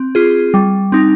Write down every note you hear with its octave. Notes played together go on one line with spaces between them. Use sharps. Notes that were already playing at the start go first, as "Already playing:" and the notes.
Already playing: C4
F4 G#4
G3
C4 D#4